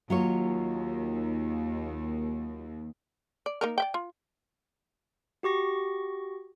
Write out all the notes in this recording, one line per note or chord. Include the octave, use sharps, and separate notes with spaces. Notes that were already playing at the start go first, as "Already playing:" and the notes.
D#2 F#3 F4 C#5
D5
A#3 D#4 A#4
D5 E5 G5
F4
F#4 G4 C#6 A#6